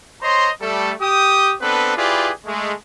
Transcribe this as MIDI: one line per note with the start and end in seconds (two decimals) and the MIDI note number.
0.22 0.50 72
0.22 0.50 73
0.22 0.50 75
0.22 0.50 82
0.22 0.50 84
0.61 0.92 55
0.61 0.92 57
0.61 0.92 69
1.01 1.54 67
1.01 1.54 79
1.01 1.54 87
1.61 1.93 59
1.61 1.93 60
1.61 1.93 62
1.61 1.93 69
1.61 1.93 71
1.96 2.30 64
1.96 2.30 65
1.96 2.30 67
1.96 2.30 68
1.96 2.30 71
1.96 2.30 74
2.46 2.72 56
2.46 2.72 57